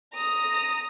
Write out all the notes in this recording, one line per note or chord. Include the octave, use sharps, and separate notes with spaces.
A#5 D#6